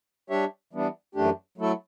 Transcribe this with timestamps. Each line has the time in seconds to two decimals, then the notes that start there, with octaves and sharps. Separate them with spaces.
0.30 G3 D4 G4 C#5 E5
0.73 E3 G3 B3 D4
1.15 F#2 E3 A3 D4 G4
1.58 F#3 A3 E4 A4